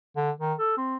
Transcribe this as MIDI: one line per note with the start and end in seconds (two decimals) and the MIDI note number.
0.16 0.31 50
0.40 0.53 51
0.59 0.76 69
0.77 0.97 60